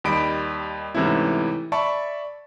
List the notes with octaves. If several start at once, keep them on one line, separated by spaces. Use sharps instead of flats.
D#2 G3 D#5 B5 D7
G#2 C3 E3 A3 C#4 E4
D5 E5 A5 B5 C#6